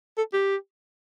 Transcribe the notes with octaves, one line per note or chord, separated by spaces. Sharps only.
A4
G4